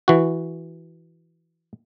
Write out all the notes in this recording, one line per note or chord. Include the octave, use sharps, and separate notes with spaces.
E3 F#4